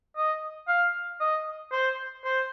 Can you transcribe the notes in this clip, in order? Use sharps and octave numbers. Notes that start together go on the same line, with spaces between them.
D#5
F5
D#5
C5
C5